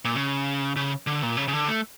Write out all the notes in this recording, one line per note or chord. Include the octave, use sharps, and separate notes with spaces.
A#2
C#3
C#3
D3
A#2
C#3
C#3
D3
A3